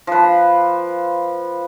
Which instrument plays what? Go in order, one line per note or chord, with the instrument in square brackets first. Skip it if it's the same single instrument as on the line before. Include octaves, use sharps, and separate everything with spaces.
[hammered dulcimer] F3 B4